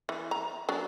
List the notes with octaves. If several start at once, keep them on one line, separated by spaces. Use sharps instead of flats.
E3
A#5
F#3 D4